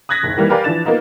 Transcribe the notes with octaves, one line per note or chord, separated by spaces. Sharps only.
D#6 F#6 G#6 A#6 B6
F#1 D#2
D#3 E3 G3 A#3
G4 A#4 B4 D5 F5 G#5
E3 F3 D4 A6 E7
A#3 B3 D#4 F4